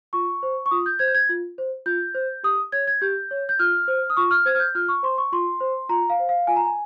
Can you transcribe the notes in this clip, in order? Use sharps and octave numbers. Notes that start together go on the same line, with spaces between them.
F4 C#6
C5
C#6
F4 D#6
G6
C5 G#6
G6
G#6
F4
C5
F4 G6
C5
G4 D#6
C#5 G#6
G#6
G4 G6
C#5
G6
F4 F6
C5
D#6
F4 C#6
F6
C5 G#6
F6
G6
F4 F6
C#6
C5 C6
C#6
F4 C6
C5
F4 A#5
F5
C5
F5
F4 G#5
A#5
G#5